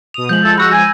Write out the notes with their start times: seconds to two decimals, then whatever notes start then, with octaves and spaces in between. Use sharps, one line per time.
0.14 B2 D#6 F7
0.29 F3 G#3 G6 F#7
0.43 A3 F4 A4
0.58 F#4 B5 E6 A#6
0.72 G#5